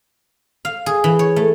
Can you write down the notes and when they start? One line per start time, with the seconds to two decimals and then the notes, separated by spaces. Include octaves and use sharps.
0.65 F5
0.86 G#4
1.04 E3
1.19 C#5
1.36 A3